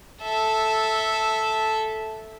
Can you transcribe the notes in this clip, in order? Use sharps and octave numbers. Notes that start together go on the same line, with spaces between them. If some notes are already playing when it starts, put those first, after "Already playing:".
A4 E5